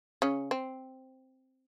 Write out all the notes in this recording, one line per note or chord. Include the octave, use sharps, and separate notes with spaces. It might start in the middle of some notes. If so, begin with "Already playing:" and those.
C#3 C#4
C4